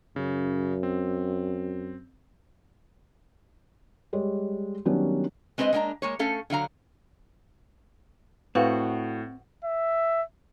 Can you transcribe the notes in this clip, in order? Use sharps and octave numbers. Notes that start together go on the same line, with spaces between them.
F#2 C#3
C4
G3 G#3 C#5
D#3 F#3 G3 B3 C#4 D4
G#3 C4 B4 C5 D#5
G#3 A#3 D4 F5 A#5
G#3 A#3 C#5
A3 C#4 A4 F5
D3 F#3 F5 A#5
A2 C4 F#4 B4 F5
E5